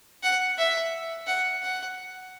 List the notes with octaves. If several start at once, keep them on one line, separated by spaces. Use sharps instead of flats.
F#5
E5
F#5
F#5